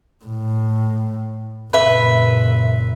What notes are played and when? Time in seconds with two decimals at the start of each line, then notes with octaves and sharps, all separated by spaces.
0.25 A2
1.73 F#1 A#2 B4 E5